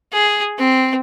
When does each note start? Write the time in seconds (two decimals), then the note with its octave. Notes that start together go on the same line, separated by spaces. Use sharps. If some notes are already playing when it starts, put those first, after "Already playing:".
0.13 G#4
0.59 C4